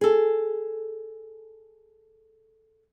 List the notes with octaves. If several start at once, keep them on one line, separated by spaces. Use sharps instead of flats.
G#4 A4